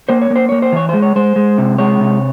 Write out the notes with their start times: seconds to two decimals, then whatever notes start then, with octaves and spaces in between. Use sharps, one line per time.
0.09 A#3 C5
0.22 C#5
0.30 A#3
0.36 C5
0.49 A#3 C#5
0.62 C5
0.72 E3 C#5
0.89 G#3 C5
1.02 C#5
1.16 G#3 C5
1.36 G#3
1.58 C3
1.78 G#3 C#5
2.00 C3